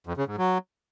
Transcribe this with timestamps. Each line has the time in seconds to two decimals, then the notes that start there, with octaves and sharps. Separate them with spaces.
0.07 F2
0.17 C#3
0.27 G#2
0.38 F#3